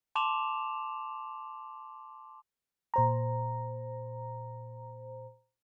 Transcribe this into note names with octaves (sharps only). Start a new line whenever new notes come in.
A5 C6 D6 E7 F7
A#2 C5 A#5